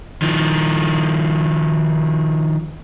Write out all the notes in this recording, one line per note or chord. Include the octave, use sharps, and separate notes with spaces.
D#3 F3